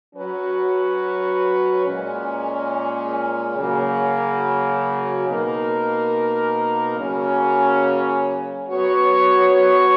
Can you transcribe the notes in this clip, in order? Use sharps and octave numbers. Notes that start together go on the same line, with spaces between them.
F#3 C#4 F#4 B4
A#2 G#3 C#4
C#3 F#3 A#3
B2 A#3 D#4 A#4
C#3 F#3 A#3 C#4
F#3 B3 F#4 C#5